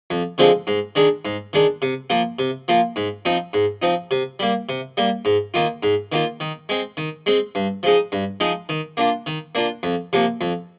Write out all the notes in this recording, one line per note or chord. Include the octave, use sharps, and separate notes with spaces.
F2
D3 F3 G#3 C4
G#2
D#3 G#3 D4
G#2
D#3 G#3 D4
C3
F3 A#3 F4
C3
F3 A#3 F4
G#2
F3 C4 D#4
G#2
F3 C4 D#4
C3
G3 A#3
C3
G3 A#3
G#2
D#3 A#3 F4
G#2
D#3 A#3 F4
D#3
G#3 C4
D#3
G#3 C4
G2
F3 G#3 D#4
G2
F3 G#3 D#4
D#3
A#3 D4 F4
D#3
A#3 D4 F4
F2
C3 F3 A#3
F2